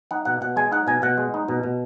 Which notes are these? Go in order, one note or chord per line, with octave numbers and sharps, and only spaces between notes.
D#4 F#5
B2 F#5
B2 F#5
G#3 G#5
D#4 F#5
B2 G#5
B2 F#5
G#3
D#4
B2
B2